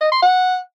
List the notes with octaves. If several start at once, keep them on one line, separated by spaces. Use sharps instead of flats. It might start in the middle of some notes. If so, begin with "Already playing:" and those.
D#5
C6
F#5